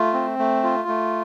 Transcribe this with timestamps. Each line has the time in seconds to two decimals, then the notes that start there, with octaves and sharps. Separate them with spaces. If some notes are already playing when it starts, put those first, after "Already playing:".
Already playing: A3 F4
0.13 C4
0.39 A3
0.64 F4
0.88 A3